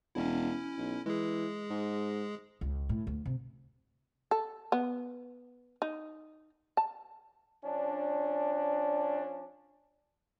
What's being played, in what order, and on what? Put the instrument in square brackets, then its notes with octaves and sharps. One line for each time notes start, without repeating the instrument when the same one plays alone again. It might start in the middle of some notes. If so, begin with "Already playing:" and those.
[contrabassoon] E1 [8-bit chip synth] C#4 E4
[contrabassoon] B1
[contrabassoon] E3 [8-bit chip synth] G#3 G#4
[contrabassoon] G#2
[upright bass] C#2
A2
D2
C3
[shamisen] A4
B3
D#4
A5
[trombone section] F3 C#4 D4